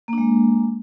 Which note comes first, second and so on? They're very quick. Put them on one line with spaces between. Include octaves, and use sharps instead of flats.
A#3 D4 G#3